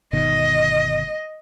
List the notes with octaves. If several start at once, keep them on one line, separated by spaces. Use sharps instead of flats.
G1 B2 D#3 D#5